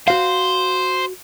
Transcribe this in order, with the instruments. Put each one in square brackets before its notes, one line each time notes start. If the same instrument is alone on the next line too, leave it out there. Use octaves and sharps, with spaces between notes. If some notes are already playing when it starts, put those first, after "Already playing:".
[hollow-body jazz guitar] F#4 F5 [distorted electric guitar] C5